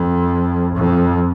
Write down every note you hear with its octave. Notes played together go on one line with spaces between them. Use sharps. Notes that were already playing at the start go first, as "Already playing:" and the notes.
Already playing: F2
F2